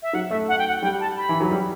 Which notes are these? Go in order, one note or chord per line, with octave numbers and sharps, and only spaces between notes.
E5
F#3 F#5
A3 E5
F#5
G5
F#5
G3 G5
A5
B5
E3
F#3
G3